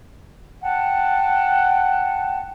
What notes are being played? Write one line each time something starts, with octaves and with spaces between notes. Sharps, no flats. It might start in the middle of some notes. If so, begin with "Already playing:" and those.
F#5 G5 A5